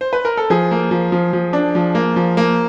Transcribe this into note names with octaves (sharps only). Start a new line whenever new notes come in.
C5
B4
A#4
A4
F3 G#4
A#3
F3
F3
F3
D4
F3
A#3
F3
A#3